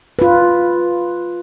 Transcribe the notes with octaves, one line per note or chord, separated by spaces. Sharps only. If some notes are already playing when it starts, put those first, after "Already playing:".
F4 B4